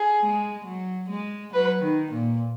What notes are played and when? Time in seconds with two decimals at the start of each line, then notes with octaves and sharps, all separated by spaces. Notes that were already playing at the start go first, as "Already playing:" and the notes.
Already playing: G#4
0.22 G#3
0.66 F#3
1.10 G#3
1.54 F#3 B4
1.83 D#3
2.12 A#2